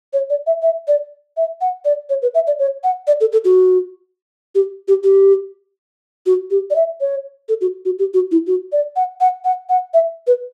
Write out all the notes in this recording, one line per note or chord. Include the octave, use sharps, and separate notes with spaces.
C#5
D5
E5
E5
D5
E5
F#5
D5
C#5
B4
E5
D5
C#5
F#5
D5
A4
A4
F#4
G4
G4
G4
F#4
G4
D5
E5
C#5
A4
F#4
F#4
G4
F#4
E4
F#4
D5
F#5
F#5
F#5
F#5
E5
B4